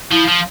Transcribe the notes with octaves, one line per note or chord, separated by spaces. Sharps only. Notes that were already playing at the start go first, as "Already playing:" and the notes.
F3 E4
F3